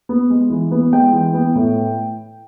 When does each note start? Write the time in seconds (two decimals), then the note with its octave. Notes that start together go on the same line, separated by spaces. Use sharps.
0.09 B3
0.30 G#3
0.50 E3
0.71 B3
0.92 G#3 G5
1.13 E3
1.34 B3
1.55 A2